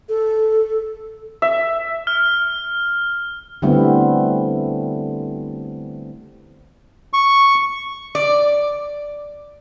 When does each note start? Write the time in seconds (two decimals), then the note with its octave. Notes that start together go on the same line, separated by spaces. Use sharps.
0.09 A4
1.42 E5
2.07 F6
3.62 D3 G3 A3 B3 C4 E4
7.13 C#6
8.15 D5